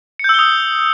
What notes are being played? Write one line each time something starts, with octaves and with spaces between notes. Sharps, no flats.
D#6 E6 G6 C#7 G7